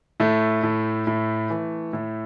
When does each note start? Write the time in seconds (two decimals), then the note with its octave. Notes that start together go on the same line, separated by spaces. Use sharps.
0.20 A2 A3
0.63 A2
1.07 A2
1.50 E3
1.93 A2